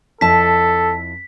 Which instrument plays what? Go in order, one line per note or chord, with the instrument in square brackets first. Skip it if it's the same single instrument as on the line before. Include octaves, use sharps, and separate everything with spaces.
[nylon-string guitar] F2 E4 A5 [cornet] A4 [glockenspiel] B6